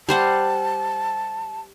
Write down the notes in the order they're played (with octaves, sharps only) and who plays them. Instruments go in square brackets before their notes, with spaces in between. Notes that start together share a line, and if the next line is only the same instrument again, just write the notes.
[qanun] G3 C5 F#5 [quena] A5